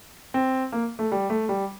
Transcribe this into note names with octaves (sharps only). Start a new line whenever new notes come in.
C4
A#3
A3
G3
A3
G3